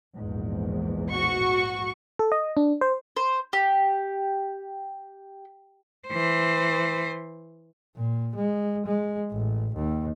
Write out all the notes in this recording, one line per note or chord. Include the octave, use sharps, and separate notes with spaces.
A#1 E2 G#2
F#4 C#6
A4
D#5
D4
C5
C5
G4
E3 C5
A#2
G#3
G#3
A1
D#2